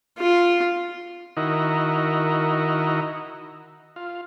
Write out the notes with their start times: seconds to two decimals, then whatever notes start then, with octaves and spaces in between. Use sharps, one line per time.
0.18 F4
1.37 D#3 D#4 E4 F#4 A#4
3.96 F4